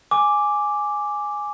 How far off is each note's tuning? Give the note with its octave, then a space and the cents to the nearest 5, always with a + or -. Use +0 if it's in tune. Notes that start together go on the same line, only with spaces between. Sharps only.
G#5 +0 D6 +0